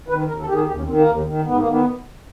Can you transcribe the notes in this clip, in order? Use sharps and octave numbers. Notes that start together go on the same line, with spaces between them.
D#3 B4
D#2 A#4
A4
D#3 G4
G#4
D#2 G4
C#4
D#3 C4
A#3
D#2
D#3
G#2 B3
A#3
D#3 B3